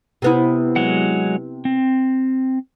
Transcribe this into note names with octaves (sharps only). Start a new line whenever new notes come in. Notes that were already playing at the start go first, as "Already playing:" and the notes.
C3 B3 E4
F#3 G#3 F#5
C4